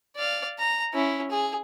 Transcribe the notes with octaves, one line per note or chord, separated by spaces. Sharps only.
D5 F5
A#5
C#4 E4
G#4